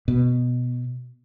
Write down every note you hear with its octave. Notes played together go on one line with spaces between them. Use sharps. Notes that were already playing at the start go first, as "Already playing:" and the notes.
B2